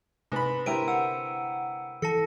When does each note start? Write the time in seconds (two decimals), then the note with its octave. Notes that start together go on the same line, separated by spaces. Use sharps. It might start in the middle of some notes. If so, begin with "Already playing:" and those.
0.32 G#2 C3 B4 B5
0.66 G#3 D4 E4 G4 A#4 C5 D7 D#7
0.88 F#5 E6
2.02 E3 A4 A5 A#6 C#7